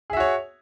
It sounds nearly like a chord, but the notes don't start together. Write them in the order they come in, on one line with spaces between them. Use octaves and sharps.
G#4 E5 F#4 C#5